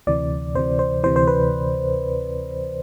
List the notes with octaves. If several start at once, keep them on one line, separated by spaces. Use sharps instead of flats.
D2 C3 E3 D5
D2 C3 E3 C5
C5
D2 C3 E3 C5
C5
B4